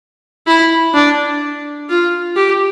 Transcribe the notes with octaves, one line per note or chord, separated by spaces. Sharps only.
E4
D4
F4
G4